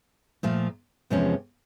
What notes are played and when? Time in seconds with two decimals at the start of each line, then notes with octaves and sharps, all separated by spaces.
0.43 A#2 F3 A3
1.10 E2 C3 F3 G#3 C#4